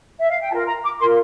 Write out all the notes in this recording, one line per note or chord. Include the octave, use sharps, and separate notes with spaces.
E5
F5
G5
F4 A#4 A5
A#5
D6
F4 A#4 C6